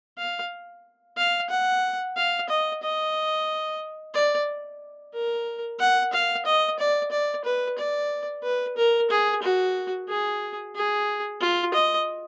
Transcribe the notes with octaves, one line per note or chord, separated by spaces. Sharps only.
F5
F5
F#5
F5
D#5
D#5
D5
A#4
F#5
F5
D#5
D5
D5
B4
D5
B4
A#4
G#4
F#4
G#4
G#4
F4
D#5